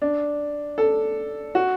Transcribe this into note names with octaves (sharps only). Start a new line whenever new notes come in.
D4
A4
F#4